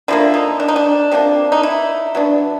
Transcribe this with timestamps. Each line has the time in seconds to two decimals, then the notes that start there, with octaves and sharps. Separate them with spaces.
0.08 D3 F3 A#3 E4
0.34 D#4
0.60 D4
0.68 D#4
0.76 D4
1.11 C3 F3 A#3 D4
1.52 D#4
1.63 E4
2.15 F#3 B3 D4